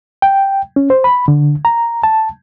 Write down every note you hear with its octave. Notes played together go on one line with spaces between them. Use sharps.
G5
C#4
C5
B5
D3
A#5
A5